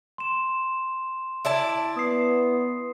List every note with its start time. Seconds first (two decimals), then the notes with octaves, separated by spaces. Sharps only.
0.18 C6 E7
1.45 E4 D5 A5
1.97 B3 D#6 C7